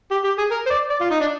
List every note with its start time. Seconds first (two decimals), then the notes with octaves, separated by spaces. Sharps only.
0.11 G4
0.24 G4
0.38 G#4
0.51 A#4
0.66 C5
0.70 D5
0.90 D5
1.01 F4
1.11 D#4
1.21 D4